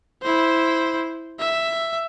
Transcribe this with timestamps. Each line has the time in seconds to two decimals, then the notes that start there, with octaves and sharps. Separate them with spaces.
0.22 E4 C5
1.39 E5